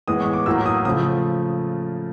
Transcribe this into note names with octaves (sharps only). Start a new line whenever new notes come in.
A2 E3 G#3 B3 D#6
C#6
D6
A2 F#3 A#3 E6
D#6
C#3 F3 A3 D#6